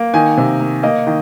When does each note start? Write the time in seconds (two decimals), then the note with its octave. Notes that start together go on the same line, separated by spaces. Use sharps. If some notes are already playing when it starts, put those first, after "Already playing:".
Already playing: A#3
0.14 D#3 G#5
0.37 C3
0.60 A#3
0.83 A#3 D#5
1.07 D#3